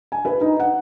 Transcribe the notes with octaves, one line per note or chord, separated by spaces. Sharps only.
G#5
B4
D#4
F#5